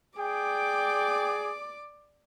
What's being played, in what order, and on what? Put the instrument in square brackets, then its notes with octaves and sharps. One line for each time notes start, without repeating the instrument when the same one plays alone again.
[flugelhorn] G#4 [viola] D5 D6 [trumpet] G5